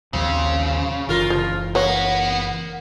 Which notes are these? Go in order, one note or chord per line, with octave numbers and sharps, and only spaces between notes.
A#1 D#2 C#3 F#3 C4
F#1 E3 F4 A#4
F3
A#3 B3 B4 C#5 F#5